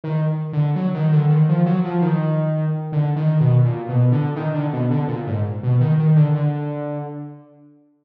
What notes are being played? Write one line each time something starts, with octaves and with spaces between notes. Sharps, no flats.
D#3
D3
F#3
D#3
D3
D#3
F3
F#3
F3
D#3
D3
D#3
B2
A#2
B2
D3
D#3
D3
B2
D3
A#2
G#2
B2
D#3
D#3
D3
D3